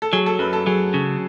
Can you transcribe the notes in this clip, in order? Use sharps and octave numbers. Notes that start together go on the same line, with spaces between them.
A4
F#3 G#4
A4
F#2 B4
A4
F#3 G#4
C#3